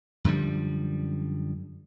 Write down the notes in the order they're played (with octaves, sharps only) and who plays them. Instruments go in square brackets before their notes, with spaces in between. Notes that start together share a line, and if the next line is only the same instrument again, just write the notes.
[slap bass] F#2 D3 F3 G3